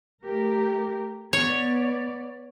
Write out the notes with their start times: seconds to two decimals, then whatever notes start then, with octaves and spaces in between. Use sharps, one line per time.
0.23 A3 G4 A#4
1.33 B3 C#5 D5